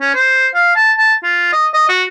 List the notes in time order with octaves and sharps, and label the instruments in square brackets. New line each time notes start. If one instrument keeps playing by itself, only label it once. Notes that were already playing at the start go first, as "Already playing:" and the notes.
[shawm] C#4
C5
F5
A5
A5
F4
D#5
D#5
F#4